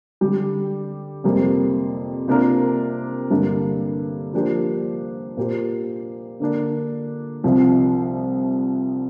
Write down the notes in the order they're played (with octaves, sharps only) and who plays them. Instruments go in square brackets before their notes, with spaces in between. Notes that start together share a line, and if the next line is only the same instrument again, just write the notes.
[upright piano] D3 G3 D4 G4
F2 C3 G3 A#3
C3 A#3 D4 F4 A#4
G2 D3 G3 A#3 D4
F3 A#3 D4 G4 C5
A#2 A#3 G4 C5
D3 A#3 D4
C2 C3 F3